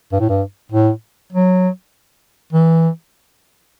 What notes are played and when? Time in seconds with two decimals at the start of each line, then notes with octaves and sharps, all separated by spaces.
0.12 G2
0.20 A2
0.29 G2
0.72 A2
1.32 F#3
2.53 E3